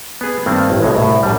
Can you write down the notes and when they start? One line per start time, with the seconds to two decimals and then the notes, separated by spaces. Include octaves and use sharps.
0.21 B3 G#4
0.46 G2 D#3 A3 A#3 C4
0.70 A1
0.82 B1 A2 G#3
0.96 C2 A2
1.23 F#2 G3